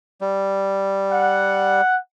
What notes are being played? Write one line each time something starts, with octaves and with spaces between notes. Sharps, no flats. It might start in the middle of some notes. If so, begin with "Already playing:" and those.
G3
F#5